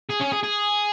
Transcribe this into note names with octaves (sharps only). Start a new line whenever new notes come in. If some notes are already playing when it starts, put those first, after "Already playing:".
G#4
C#4
G#4
G#4